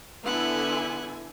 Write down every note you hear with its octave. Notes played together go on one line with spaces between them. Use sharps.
D3 B3 E4 F#5 G#5